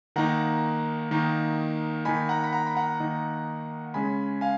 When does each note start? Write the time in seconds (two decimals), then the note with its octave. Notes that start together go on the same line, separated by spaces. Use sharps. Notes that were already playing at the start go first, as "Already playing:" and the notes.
0.16 D#3 A#3 D#4 F#5 A#5
1.11 D#3 A#3 D#4
2.05 D#3 A#3 D#4 G#5 B5
2.29 F#5 A#5
2.44 B5
2.53 F#5 A#5
2.67 B5
2.76 F#5 A#5
3.00 D#3 A#3 D#4
3.94 C#3 G#3 C#4 G#5 B5
4.41 F5 G#5